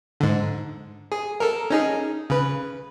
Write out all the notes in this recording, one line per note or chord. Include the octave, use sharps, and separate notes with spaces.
G#2 D3
G#4
A4 A#4
C#4 D#4 G#4
C#3 B4